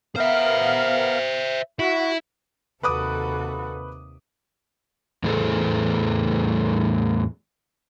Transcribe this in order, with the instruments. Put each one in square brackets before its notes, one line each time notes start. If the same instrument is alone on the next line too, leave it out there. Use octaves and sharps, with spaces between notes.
[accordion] B3 A#4 F5 [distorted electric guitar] C5 E5
[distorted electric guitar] E4 [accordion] F#4
[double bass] D#2 C3 [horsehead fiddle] F#4 A4 [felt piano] B4 D6 D#6
[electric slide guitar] E2 A2 A3 G#4 A4 C5